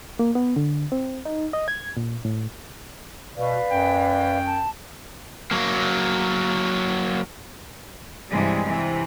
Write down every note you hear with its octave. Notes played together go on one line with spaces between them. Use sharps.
A#3
B3
D3
C4
D#4
D#5
G#6
A#2
A2
B2 B4 D5 F5
F#2 G5
A5
F#3 A#3
G2 C3 E3 G3 G#3
C3 E3